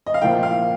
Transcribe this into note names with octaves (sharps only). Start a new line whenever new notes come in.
D#5
F5
A#2 F3 A#3 G5
F5